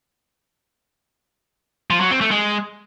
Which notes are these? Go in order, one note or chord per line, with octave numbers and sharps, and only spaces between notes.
F3
F#3
C4
A3
G#3